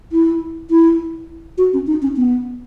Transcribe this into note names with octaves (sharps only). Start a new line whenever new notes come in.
E4
E4
F#4
C#4
D#4
C#4
B3